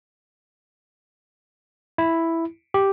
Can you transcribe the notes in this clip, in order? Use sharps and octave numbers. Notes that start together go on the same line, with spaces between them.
E4
G4